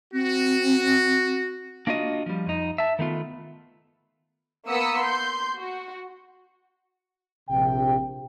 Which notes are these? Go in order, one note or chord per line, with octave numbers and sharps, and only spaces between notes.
C4 F#4
A#3 D4 F4 F#4 D#5
F3 G3
F2 D#4
E5 A5
D#3 A3 B3 F4
A#3 B3 D#6 E6 B6 C#7
C6 G6
F#4
A#1 C3 G5